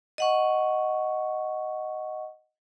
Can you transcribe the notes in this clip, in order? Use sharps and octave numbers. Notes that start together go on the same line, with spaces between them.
D#5 F#5 C#6